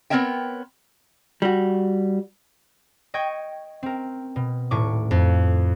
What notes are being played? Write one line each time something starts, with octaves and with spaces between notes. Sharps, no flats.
B3 C4 A#4 C#5 E5 G5
G3 F#4
D#5 G5 C#6 G#6
C4 A#4
B2
D#1 A2 C#6 D6
F2